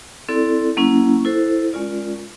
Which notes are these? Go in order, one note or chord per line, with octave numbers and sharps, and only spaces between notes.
C4 E4 A4 D5
F#3 A#3 C#4 E4
E4 A4 C5
G#3 C#4 F4 A#4 D5